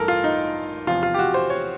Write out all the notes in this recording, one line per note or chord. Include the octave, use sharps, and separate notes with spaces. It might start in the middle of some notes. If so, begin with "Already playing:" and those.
Already playing: A1 G2 E3 A4 A#4
F4
D#4
E2 C3 F3 F4
F4
G4
F#4
C5
C#5